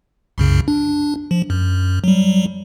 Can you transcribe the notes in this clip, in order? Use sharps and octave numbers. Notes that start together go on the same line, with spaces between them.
C2 F#2 C#3
D4
F3
F#2
F#3 G3